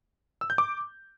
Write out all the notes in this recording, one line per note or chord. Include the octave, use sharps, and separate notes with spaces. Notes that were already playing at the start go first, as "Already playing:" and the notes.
E6
G6
D6